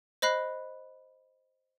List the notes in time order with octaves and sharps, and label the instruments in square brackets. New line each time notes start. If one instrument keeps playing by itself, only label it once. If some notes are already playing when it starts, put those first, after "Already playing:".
[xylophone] C5 D#5 B5 F#6 C7